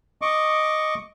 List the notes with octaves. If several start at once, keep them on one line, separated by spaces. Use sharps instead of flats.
D#5 C#6 D6